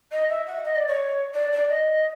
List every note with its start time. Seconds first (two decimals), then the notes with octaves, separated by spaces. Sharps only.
0.12 D#5
0.29 E5
0.47 F#5
0.65 D#5
0.76 D5
0.87 C#5
1.34 D5
1.52 D5
1.69 D#5